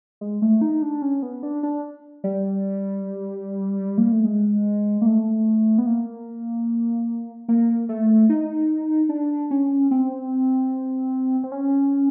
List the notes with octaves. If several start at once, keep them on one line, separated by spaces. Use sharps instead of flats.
G#3
A3
D#4
D4
C#4
B3
D4
D4
G3
A#3
A3
G#3
A#3
A3
B3
A#3
A#3
A3
D#4
D4
C#4
C4
C4
C#4